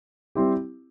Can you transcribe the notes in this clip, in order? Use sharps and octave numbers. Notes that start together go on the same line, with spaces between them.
G3 C4 E4 G4